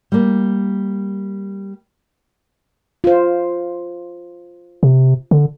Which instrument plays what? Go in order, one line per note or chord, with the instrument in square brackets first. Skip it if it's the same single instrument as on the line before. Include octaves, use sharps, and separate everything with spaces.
[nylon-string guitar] G3 A#3
[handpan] F4 C5
[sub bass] C3
D3